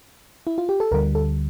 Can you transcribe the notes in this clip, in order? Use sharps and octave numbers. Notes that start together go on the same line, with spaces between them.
E4
F4
G4
A4
D2 D3 G3 A#4
A4